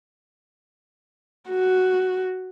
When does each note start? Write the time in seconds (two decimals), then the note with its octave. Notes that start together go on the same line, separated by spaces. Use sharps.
1.50 F#4